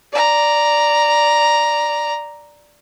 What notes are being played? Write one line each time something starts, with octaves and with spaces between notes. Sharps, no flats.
D5 A#5